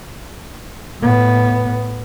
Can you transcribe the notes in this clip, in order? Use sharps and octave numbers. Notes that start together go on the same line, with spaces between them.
A2 B3